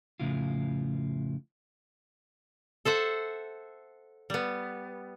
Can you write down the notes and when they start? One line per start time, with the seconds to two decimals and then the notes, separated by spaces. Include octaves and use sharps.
0.20 F2 A2 C#3 E4 F4
2.85 A4 C5 E5 F#5
4.30 G3 B3